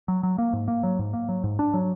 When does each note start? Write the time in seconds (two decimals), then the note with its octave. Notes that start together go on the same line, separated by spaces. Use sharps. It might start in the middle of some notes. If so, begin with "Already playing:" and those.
0.08 F#3
0.23 F#3
0.38 A#3
0.53 G#2
0.68 A#3
0.83 F#3
0.99 G#2
1.13 A#3
1.29 F#3
1.44 G#2
1.59 D4
1.74 F#3